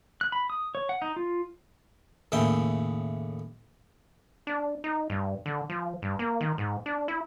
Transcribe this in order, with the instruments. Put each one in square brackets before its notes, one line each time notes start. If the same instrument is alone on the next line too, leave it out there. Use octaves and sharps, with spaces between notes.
[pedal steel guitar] F#6
B5
D#6
C#5
F#5
D#4
F4
[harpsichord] D#2 A2 C#3 E4 G5
[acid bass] D4
D#4
G2
D3
F3
G2
A#3
D#3
G#2
D4
E4